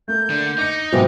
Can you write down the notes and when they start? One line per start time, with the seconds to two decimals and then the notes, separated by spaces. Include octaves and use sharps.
0.08 A3 A#3 G6
0.30 D3
0.58 D#4 D6 C#7
0.93 G#2 C3 F#3 B3 F4 C5